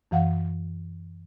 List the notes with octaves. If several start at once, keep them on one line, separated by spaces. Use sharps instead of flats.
F#2 E3 F5 F#5